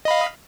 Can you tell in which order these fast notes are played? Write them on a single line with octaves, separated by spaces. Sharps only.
D#5 B5 F5